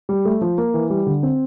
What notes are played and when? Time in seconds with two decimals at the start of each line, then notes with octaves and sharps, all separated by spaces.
0.09 G3
0.25 A3
0.41 F3
0.58 A#3
0.74 E3
0.90 G3
1.06 D3
1.23 C4